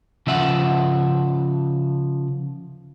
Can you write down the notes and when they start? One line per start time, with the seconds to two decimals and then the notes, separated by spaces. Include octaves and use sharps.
0.27 C#3 F3 E5 F#5